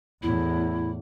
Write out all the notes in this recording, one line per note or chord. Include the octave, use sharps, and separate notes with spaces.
E2 A2 E4